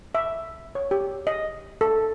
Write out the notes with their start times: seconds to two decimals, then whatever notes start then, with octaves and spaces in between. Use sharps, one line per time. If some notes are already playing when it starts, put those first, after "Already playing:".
0.15 E5
0.75 C#5
0.91 G4
1.27 D#5
1.81 A4